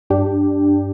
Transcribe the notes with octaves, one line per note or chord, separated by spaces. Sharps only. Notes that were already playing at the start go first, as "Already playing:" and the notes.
G2 D4 G4